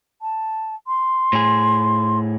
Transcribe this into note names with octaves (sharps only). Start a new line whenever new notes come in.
A5
C6
A2 G#4